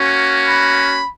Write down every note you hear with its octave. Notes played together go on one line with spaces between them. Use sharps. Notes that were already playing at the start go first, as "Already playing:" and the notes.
Already playing: A#3 C#4 F#4
B5